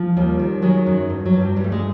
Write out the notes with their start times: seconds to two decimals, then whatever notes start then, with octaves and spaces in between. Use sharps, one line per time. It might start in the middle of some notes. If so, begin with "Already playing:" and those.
Already playing: F3
0.17 D#2 G3
0.39 D#3
0.62 D#3 F#3 G#3
0.86 F#2
1.10 G2
1.25 F#3
1.33 G2
1.41 G3
1.56 G2 G3
1.64 A3
1.72 G#3